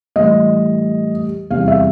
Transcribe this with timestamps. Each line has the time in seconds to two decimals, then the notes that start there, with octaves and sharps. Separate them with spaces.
0.16 A2 E3 G3 D#5
1.50 E2 C3 E3 G3 F5
1.68 E5